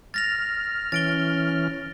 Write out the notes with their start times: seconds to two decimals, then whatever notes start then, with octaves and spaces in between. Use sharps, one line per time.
0.14 F6 A6 A#6 F7
0.92 E3 C#4 F6 A6 D7 G7